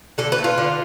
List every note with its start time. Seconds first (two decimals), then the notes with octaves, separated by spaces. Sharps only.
0.18 D3 A4
0.32 B4
0.38 A3
0.44 F4
0.58 D3